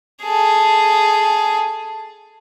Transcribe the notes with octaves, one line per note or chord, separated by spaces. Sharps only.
G#4 A4